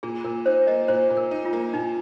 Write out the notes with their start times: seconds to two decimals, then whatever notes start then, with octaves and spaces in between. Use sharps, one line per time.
0.03 A#2 G#4
0.24 A#2 A#4
0.46 D#4 C5
0.67 A#3 D#5
0.88 A#2 C5
1.10 A#2
1.17 A#4
1.31 D#4
1.45 F4
1.53 A#3
1.73 A#2 D#4